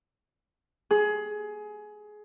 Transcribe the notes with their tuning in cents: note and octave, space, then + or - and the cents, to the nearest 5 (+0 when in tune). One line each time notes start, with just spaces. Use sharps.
G#4 +20